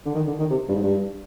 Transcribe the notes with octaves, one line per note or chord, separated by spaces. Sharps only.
D3
D#3
D3
D#3
C3
G2
G#2
G2